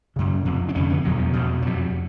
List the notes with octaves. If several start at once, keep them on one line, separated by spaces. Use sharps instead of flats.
F#2 C#3
F2 C3
D4
F2 D3 C#4
B3
E2 B2 F#3
F3
E2 B2
F2 C3 F#3